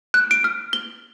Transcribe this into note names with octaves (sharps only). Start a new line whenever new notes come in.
F#6
D7
F6
G7